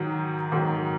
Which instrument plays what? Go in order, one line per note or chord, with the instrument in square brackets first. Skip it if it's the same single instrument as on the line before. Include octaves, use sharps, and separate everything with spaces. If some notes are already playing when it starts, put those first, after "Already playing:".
Already playing: [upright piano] G#2 D#3 F#3
G#2 D#3 F#3